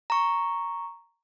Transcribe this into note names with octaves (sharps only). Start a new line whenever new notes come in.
A#5 C#6